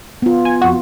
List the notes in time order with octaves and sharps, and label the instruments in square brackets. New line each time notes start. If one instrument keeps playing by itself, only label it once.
[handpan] B3 F4
[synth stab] G#5
F2 F#4